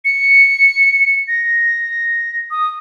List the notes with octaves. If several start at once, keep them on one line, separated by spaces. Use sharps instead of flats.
C#7
A#6
D#6